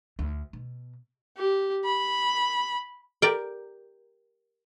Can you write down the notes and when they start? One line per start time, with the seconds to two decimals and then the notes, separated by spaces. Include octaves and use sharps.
0.19 D2
0.53 B2
1.37 G4
1.85 B5
3.22 G4 A#4 D5 G5